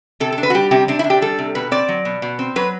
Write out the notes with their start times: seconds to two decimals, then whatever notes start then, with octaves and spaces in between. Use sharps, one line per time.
0.20 C3 A4
0.32 A4
0.38 D4
0.43 B4
0.50 F#4
0.55 G3 G4
0.71 C3 G4
0.88 C3 D4
0.99 E4
1.04 D4
1.10 G4
1.22 G3 A4
1.39 C3
1.55 B2 B4
1.71 C4 D5
1.89 F#3
2.05 B2
2.22 B2
2.39 C4
2.56 F#3 B4